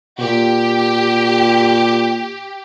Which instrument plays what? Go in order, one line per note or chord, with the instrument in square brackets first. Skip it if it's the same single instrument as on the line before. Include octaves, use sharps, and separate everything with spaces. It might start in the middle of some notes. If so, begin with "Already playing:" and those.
[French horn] A#2 [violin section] G4